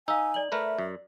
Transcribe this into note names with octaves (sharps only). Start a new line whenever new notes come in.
D#4 F5 G#5 E6
D5 F#7
A3 A#4 B4 E5
F#2